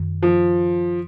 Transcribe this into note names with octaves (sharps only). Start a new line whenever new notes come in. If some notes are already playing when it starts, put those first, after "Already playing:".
Already playing: F#2 D#3
F3